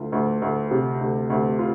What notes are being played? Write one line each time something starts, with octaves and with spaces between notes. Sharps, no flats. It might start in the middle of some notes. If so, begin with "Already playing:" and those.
Already playing: D2 F4
D2
D2
C3
D2
D2
F4